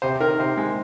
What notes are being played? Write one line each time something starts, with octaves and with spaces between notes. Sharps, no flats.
C3 C5
D#3 A#4
C3 C5
G#3